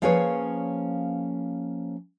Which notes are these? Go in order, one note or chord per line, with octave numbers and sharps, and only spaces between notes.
F3 A#3 C#4 G#4 B4 C#5